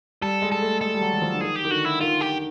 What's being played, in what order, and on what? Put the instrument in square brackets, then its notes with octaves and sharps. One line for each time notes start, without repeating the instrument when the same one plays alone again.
[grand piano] G3 [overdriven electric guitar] A4
[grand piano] G#3
[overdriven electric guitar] A4
[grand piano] A3
[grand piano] G#3 [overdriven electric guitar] A4
[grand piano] G3
F#3
F#3
F3
D3
[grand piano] D#3 [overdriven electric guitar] G#4
[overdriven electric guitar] G4
[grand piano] D#3
[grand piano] D3 [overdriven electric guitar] F#4
[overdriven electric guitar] E4
[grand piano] D#3 [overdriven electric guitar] F4
[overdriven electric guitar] G4